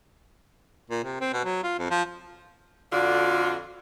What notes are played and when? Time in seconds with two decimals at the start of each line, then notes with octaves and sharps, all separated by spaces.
0.90 A#2
1.04 C3
1.21 C4
1.33 B2
1.45 F#3
1.63 F4
1.79 F2
1.91 F3
2.92 F2 D3 F4 F#4 D5